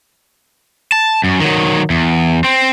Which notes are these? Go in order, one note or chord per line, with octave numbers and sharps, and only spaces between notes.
A5
F#2
D#3 F#3
E2
C4